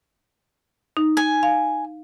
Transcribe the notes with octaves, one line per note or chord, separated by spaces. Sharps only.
D#4
G#5
F5